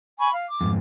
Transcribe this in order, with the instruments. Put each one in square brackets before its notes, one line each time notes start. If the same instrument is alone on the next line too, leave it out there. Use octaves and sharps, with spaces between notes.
[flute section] G#5 B5 C#6
F5
D6
[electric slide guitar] F2 G#2